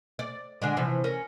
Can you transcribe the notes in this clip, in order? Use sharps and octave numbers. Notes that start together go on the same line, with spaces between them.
D5
D3 G#3 D4
C3 E3 F3
C#4 A#4